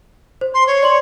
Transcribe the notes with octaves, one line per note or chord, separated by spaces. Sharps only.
C5
C6
C#5
D5 C6 F#7